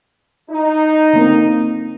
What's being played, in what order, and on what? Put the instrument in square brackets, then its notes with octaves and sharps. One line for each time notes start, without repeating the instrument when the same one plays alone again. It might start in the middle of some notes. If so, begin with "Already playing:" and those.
[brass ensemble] D#4
[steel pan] D3 A#3 C4